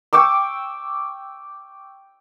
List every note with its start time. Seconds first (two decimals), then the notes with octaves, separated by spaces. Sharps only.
0.13 G5 C#6 D6 E6